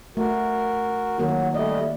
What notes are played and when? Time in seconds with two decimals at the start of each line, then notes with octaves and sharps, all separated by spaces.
0.17 A3 F#4 A#4
1.18 D#3 F#3 A#3 F#4
1.54 G3 A3 D5 D#5